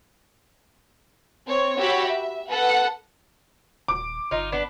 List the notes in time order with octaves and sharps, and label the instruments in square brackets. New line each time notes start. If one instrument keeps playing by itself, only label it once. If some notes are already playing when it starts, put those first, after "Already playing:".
[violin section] C4 C#5
F#4 G4 C#5 B5 E6
E5
A4 B4 F#5
[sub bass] D#1 [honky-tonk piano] D6
[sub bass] G1 [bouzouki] D#4 F4
[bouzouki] B3 D4